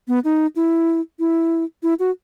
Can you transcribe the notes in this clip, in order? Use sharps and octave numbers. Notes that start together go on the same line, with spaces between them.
B3
D#4
E4
E4
E4
F#4